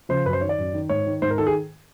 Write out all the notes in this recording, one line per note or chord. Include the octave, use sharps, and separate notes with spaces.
C#3 F3 C5
F#2 B4
C5
D#3 C#5
D5
F#2
D#3
G#2 C#5
D#3
G#2 C5
A#4
D#3 A4
G#4